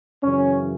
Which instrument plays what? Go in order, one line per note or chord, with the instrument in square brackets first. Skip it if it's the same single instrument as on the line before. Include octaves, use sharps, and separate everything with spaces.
[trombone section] F#2 C#3 E3 C#4